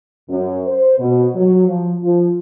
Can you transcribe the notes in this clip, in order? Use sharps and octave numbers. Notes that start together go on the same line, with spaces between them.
F#2
C5
B2
F#3
F3
F3